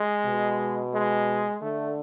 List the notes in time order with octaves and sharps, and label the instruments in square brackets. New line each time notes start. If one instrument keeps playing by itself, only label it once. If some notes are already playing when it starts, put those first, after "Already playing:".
Already playing: [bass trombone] G#3
[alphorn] B2
[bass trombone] G#3
[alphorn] D3 [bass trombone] A3